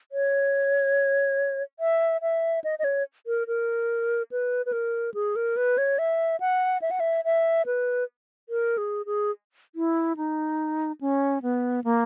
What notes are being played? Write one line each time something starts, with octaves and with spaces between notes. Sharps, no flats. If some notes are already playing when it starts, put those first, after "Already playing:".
C#5
E5
E5
D#5
D#5
C#5
A#4
A#4
B4
B4
A#4
G#4
A#4
B4
C#5
E5
F#5
E5
F#5
E5
E5
B4
A#4
G#4
G#4
E4
D#4
C#4
B3
A#3